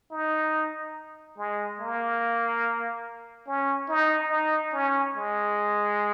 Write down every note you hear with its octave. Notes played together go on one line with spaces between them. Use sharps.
D#4
G#3
A#3
C#4
D#4
D#4
C#4
G#3